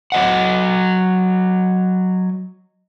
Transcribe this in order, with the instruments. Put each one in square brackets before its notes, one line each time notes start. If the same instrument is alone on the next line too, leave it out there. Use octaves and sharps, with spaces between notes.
[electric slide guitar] F#3 D#5 F#5